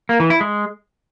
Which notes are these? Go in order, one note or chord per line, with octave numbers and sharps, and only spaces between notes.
A#3
E3
E4
G#3